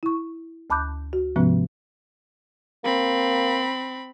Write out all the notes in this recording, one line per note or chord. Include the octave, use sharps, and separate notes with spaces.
E4 C#6
D2 A5 B5 D6 F#6 G6
F#4
G#2 C3 F3 G#3 B3 C#4
A#3 C4 B5